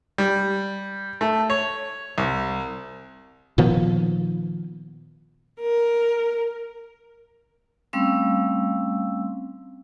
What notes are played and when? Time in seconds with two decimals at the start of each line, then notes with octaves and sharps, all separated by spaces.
0.18 G3
1.21 A3
1.50 C#5
2.18 C2
3.58 A#2 D#3 F3 B3
5.61 A#4
7.93 G3 A3 C4 C#4 F5 E6